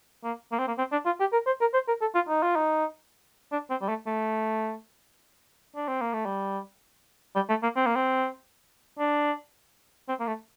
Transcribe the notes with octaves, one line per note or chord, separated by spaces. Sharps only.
A#3
A#3
C4
A#3
C4
D4
F4
G4
A#4
C5
A#4
C5
A#4
A4
F4
D#4
F4
D#4
D4
C4
G3
A3
A3
D4
C4
A#3
A3
G3
G3
A3
A#3
C4
A#3
C4
D4
C4
A#3
A3